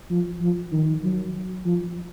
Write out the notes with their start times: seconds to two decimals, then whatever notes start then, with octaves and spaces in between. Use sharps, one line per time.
0.10 F3
0.41 F3
0.72 D#3
1.03 F#3
1.65 F3